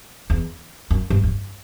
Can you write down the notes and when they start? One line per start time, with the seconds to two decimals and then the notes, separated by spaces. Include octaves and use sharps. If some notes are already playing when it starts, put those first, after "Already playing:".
0.30 E2
0.91 F#2
1.10 G2
1.23 F2